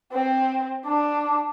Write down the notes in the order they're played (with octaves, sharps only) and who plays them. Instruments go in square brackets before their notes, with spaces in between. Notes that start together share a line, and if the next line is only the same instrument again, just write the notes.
[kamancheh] C4
D4